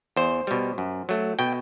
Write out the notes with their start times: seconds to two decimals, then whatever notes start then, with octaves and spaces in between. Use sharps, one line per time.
0.16 E2 C5
0.47 B2 G3
0.78 F#2
1.09 F#3 A3
1.39 B2 G5